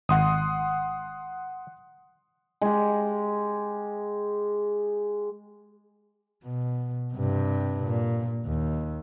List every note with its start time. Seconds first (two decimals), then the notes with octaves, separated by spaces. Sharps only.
0.09 G#1 F#5 C6 D#6
2.61 G#3 G4
6.44 B2
7.14 G2 C3
7.83 A#2
8.46 D#2